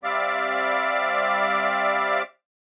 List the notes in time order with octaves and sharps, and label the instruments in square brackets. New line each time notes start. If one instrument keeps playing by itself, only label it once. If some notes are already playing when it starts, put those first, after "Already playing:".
[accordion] G3 C4 D5 E5 F5 D6